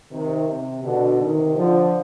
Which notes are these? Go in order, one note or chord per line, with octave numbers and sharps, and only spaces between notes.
C3 D#3
C3
B2 D3
C3 D#3
D3 F3